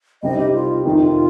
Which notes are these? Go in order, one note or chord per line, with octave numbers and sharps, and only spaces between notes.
C2 C3 G3 C4 D#4 D#5
G4
F4
F2 C3 D#3 D#4
F4